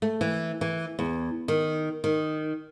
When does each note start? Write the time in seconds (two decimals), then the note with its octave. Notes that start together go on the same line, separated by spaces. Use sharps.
0.02 A3
0.21 E3
0.61 E3
0.99 E2
1.48 D#3
2.04 D#3